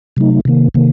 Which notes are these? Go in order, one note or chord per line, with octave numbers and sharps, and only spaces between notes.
C3 F#3 A3 D#4
C3 D#3 A#3
C3 D#3 A#3